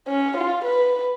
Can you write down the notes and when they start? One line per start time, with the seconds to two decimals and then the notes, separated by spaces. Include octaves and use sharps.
0.08 C#4
0.37 F4
0.65 B4